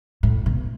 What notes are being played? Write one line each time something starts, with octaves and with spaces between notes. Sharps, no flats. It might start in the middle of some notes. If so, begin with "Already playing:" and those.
A2
B2